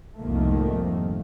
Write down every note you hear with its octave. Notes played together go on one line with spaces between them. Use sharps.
C2 F2 G#2 D#3 A3 A#3